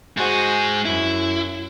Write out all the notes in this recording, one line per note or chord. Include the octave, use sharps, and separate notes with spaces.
G#2 F#4 G#4 C5 D#5
F#2 E4